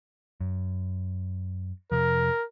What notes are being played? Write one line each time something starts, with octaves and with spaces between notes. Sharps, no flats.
F#2
F2 C3 F3 A#4